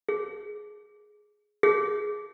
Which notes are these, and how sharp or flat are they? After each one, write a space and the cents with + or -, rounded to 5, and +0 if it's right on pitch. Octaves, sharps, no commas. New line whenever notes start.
G#4 +10
G#4 +5